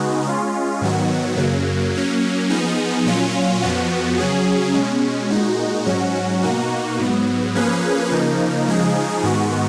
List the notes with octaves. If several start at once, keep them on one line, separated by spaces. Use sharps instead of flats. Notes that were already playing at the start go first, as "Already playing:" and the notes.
Already playing: C#3 G#3 B3 D#4 F#4
G#3 C#4 F4
G#2 D#3 F#3 B3 F#4
F#2 C#3 F#3 A#3
F#3 A#3 C#4
F3 B3 D#4 G#4
A#2 F#3 C#4 F4
F2 F3 B3 F#4
C#3 F#3 C#4 G#4
B2 G#3 C#4
A#2 G#3 D#4 F#4
G#2 F#3 C#4 F#4
B2 A#3 D#4 F#4
G#2 F#3 B3
F3 A#3 C#4 G#4 B4
C#3 F3 A#3 D#4
C#3 F3 G#3 D#4 G#4
G#2 D#3 G#3 B3 F#4